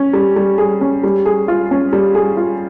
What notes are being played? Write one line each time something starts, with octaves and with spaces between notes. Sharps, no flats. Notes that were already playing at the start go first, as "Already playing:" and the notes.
Already playing: C#4
G3
G3
G#4
C#4
G3
G#4
F4
C#4
G3
G#4
F4